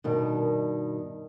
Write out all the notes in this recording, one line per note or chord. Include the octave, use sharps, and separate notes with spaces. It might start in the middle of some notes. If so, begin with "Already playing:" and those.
G2 B2 D#3